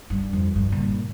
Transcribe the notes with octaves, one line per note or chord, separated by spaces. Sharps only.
G2
F2
G2
C3
A#2